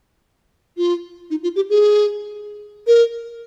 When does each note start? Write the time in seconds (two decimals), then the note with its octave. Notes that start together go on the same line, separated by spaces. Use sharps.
0.77 F4
1.30 D#4
1.43 F4
1.56 G4
1.70 G#4
2.87 A#4